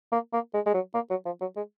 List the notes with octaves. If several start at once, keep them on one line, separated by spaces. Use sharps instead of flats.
A#3
A#3
G#3
G#3
F#3
A#3
F#3
F3
F#3
G#3